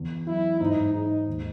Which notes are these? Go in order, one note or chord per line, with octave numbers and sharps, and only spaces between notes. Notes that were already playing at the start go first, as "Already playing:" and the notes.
Already playing: E2
F#3 E4
G#2 D#4
G#3 D#4
D#2